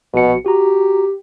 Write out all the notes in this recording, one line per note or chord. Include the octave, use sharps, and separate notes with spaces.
A#1 B2 F#4 C#7
F#4 G4 A#5